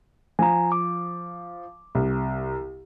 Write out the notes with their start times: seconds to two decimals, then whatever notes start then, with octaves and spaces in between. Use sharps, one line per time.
0.39 F3 G#5 A#5
0.72 D6
1.95 C2